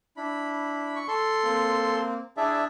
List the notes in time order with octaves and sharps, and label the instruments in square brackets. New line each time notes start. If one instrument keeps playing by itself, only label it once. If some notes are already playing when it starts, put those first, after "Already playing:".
[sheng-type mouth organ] D4 E4 B5
[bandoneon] C#6
A4 C6
[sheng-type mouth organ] A#3 C4
[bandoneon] D4 E5 [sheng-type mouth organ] E4 G#4 D5